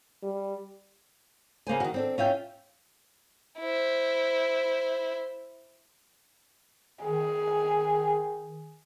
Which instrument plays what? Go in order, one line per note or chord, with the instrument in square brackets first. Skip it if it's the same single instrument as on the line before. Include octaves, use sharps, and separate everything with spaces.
[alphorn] G3
[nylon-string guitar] C#3 A#3 C5 G#5
D#3 F#4
C4 D4 A4
C#4 F4 E5 G5
[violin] E4 C5
[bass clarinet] D#3 [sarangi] G#4